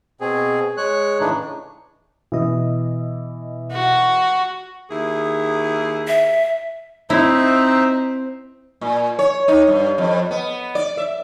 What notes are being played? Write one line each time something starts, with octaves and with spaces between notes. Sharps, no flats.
B2 C4 G#4
G#3 C#5 F#6
A2 C#3 E3 A3 D4 D#4
B2 E3 D#5
F#4
D#2 E4 G#4
E5
C4 D#4 E4 E5 A#5
A#2
C#5
D#4
G2
F2
B3
D5
E5